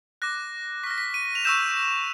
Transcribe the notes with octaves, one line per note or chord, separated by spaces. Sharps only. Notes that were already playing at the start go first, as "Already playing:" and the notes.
D6 F#6 A#6
C#6 F6 A#6 B6
B6
D#7
F7
C#6 E6 G6 E7